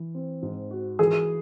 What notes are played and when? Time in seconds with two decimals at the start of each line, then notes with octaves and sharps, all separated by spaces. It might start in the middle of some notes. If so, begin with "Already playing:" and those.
Already playing: E3
0.15 C4
0.42 G#2
0.71 F#4
0.99 E3 G#4